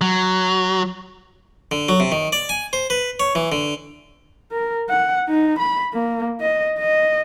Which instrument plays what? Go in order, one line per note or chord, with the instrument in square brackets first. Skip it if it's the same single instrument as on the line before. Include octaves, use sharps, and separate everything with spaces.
[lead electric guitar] F#3
[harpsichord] D3
F#3
C3
D#3
D5
G#5
C5
B4
C#5
E3
D3
[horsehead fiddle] A#4
F#5
D#4
B5
A#3
D#5
D#5